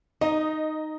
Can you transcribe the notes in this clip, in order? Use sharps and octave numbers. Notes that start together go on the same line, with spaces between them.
D#4 D#5